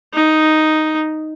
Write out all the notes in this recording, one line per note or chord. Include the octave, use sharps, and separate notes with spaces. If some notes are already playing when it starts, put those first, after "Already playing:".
D#4